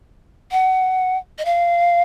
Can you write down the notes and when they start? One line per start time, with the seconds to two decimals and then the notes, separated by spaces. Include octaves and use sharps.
0.51 F#5
1.38 D#5
1.45 F5